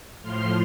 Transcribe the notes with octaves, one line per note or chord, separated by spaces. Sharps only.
A2 F3 C6 F6